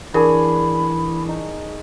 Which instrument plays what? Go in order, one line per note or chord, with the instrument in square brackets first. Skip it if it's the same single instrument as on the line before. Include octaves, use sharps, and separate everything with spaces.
[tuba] E3 [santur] D4 G#4 C#5 [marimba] A#4 [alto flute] B5
[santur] D#4